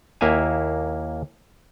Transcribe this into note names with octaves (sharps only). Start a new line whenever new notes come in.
D#2 A#3 E4 E5 F5 G#5